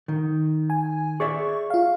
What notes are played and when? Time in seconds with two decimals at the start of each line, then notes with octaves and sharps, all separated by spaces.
0.08 D#3
0.70 G#5
1.20 G#4 D5 E5 C#6
1.70 F4 F5